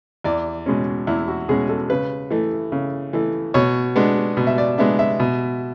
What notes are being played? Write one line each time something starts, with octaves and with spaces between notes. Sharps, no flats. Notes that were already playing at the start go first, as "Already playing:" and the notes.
E2 D5
B2 G#3 C#4
E2 E4
F#4
B2 G#3 C#4 G#4
A4
C#3 B4
E3 A3
C#3
E3 A3
B2 C#5
G#3 B3 D4
B2
E5
D5
G#3 B3 D4 E5
E5
B2